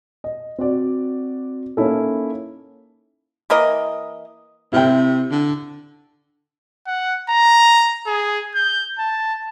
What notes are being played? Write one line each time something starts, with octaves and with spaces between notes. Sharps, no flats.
D#5
C4 F#4 D5
A#3 C#4 D#4 E4 A4
E3 A#3 A#4 D#5
C3 E4 G5
D3
F#5
A#5
G#4
G6
A5